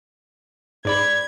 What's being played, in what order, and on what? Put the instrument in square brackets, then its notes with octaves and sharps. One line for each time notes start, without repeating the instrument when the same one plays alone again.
[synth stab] G#2 D5 B5 [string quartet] G#6